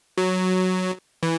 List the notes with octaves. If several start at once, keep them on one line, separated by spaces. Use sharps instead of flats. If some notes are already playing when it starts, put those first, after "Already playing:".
F#3
E3